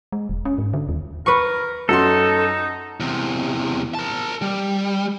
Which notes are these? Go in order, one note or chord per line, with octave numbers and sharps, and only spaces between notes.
G#3
E1
C#4
G#2
D3
D#2
A#4 B4 C#6
F#2 D#4 F#4 A4 C6
E2 C3
A#4 A5
G3